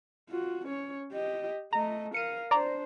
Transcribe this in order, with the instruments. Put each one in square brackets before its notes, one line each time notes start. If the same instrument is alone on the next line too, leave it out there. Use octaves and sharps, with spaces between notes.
[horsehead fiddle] F4 F#4
C#4 C#5
G4 D#5
[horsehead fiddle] A3 D#5 [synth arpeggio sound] A#5
[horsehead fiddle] A#4 F5 [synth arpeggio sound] C#7 D#7
[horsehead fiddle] D4 C5 [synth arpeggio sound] D5 A#5